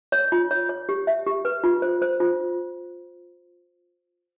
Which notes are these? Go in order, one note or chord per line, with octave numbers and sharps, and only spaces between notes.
C#5
F4
C#5
C#5
G4
E5
G4
B4
F4
C5
C5
F4